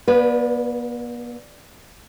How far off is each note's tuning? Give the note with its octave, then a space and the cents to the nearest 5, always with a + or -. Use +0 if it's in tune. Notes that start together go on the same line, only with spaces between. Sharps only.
B3 -45 B4 -5 D5 +0